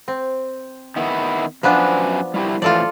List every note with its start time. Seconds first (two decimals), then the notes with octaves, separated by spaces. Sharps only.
0.08 C4
0.96 D#3 B3 E4
1.63 F#2 F3 B3 D4 B4 G#5
2.34 G3 E4 G4
2.62 A2 E3 F3 F4 A4 D5